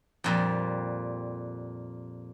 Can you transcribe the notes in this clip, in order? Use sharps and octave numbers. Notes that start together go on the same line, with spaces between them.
F2 A#2 G3